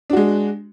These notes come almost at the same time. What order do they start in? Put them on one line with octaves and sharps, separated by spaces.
D4 F#4 G#3